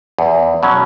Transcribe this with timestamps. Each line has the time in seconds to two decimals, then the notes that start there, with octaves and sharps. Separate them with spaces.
0.18 E2
0.63 B2 F#3 C#4